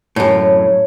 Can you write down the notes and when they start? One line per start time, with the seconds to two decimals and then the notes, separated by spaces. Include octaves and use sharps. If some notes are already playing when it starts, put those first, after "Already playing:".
0.16 F#2 A2 C#5